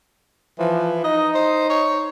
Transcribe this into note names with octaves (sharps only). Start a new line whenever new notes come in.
E3 F3
D#4 D#5
C5
C#5